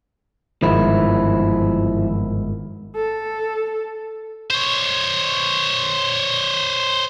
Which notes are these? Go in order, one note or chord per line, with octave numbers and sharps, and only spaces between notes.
G1 G#2 D#3 F3 E4
A4
C5 C#5